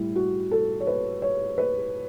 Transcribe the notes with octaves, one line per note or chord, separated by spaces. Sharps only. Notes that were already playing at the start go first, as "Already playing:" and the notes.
Already playing: A2 G3 E4
F#4
A4
C#5
B4
C#5
B4